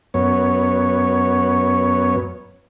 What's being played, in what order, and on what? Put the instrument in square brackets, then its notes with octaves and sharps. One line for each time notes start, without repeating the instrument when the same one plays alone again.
[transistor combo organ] F#2 B3 C#5